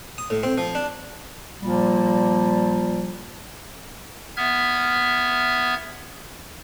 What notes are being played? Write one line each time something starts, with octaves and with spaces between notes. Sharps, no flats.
D#6
A2
C4
F3
D4
A#2 F3 G3 A#3
B3 E5 F6 G#6